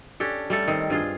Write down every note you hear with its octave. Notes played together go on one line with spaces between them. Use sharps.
C#4 D4 G4 A4
G3 A3 A4
D#3 C4
G2 F4 G#4